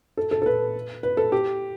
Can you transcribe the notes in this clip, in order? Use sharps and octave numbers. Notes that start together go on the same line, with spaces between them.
A4
A4
A4
B4
B4
A4
G4